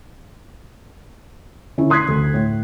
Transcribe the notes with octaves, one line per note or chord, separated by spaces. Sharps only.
D3 C#4 E4
C6 D#6 F#6 G#6 B6 C7
D2
A2